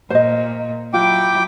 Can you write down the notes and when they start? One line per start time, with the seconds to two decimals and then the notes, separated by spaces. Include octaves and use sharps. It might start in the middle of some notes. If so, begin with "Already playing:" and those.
0.10 A#2 C5 D#5
0.94 F#3 E4 F4 G5 D6